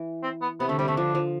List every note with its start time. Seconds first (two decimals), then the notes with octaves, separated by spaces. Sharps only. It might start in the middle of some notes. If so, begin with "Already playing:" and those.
Already playing: E3
0.23 C4
0.42 B3
0.60 C3 B3
0.69 D3 A3
0.78 C3 G3
0.88 D3 A3
0.97 F3 D4
1.15 F3